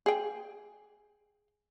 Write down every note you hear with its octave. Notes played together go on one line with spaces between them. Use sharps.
G#4 G5